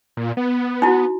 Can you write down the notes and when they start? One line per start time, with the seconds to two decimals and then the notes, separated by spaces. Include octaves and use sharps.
0.17 A#2
0.37 B3
0.82 D#4 E4 F#4